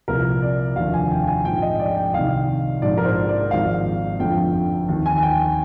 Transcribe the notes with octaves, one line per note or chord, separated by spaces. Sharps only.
C2 A#2 F3 A#4
D5
F1 D#2 D3 F3 F5
G#5
G5
G#5
A#1 G#2 F3 G5
D#5
D5
G5
C2 C3 D#3 F5
A#1 G#2 F3 D5
A#4
C5
D5
G#1 G#2 F3 F5
G1 F2 D3 F3 G5
D#2 D#3
G#5
G#5
G5